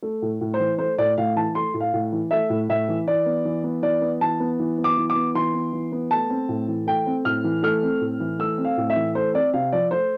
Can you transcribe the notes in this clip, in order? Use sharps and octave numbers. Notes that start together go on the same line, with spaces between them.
A3
A2
A2
C5
E3
A3 C5
A2 D5
A2 F5
E3 A5
A3 C6
A2
F5
A2
E3
A3 E5
A2
A2 E5
E3
E3 D5
B3
E3
B3
E3 D5
B3
E3 A5
B3
E3
B3
D6
E3
D6
B3
E3 C6
B3
E3
B3
A3 A5
C4
A2
E3
A3 G5
C4
A2 F6
E3
A3 F6
C4
A2
E3
A3 E6
C4
F5
A2
E5
E3
A3 C5
C4 D5
C3 F5
F3 D5
A3 C5